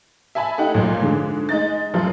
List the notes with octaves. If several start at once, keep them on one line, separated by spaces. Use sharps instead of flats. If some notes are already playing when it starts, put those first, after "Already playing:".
E5 G#5 A5 B5
A3 D#4 G4 F#5
C#2 A#2 F#3 G#3
G#2 D3 G#4
G#3 D#4 D#5 A6
F#1 F#2 F3 F4